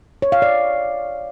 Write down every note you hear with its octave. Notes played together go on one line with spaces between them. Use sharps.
C#5
F5
D5